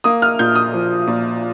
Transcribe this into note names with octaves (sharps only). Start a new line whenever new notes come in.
A#3 D#6
F6
A#2 G6
D#6
F3
A#2